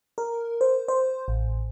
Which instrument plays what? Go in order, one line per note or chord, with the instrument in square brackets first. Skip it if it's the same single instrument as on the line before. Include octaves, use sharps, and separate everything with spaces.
[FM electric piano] A#4
C5
C5
A1